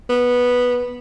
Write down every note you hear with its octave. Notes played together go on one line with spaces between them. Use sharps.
B3